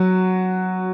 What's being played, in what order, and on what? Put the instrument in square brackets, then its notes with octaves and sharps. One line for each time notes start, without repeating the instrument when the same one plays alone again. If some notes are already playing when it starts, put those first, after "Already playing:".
Already playing: [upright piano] F#3 F#4